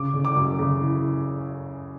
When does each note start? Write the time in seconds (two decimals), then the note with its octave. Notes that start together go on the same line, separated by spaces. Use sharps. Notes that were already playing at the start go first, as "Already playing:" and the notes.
Already playing: C#3 D6
0.14 C#3
0.25 D6
0.36 F#2
0.59 C#3
0.81 E3